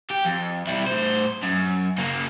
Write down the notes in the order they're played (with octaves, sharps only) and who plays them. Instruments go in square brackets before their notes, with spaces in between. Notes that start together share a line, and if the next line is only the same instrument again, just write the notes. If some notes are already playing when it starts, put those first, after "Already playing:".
[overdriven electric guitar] G4
F2
G3 E4
A2 C5
F#2
C#3 A#3